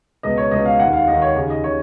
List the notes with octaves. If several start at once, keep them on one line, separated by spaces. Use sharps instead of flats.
C#2 B2 D#5
C#5
C#2 B2 D#5
F5
D#2 D#3 F#5
F5
D#2 D#3 D#5
C#5
D#2 C#3
D#5
C#3 C#5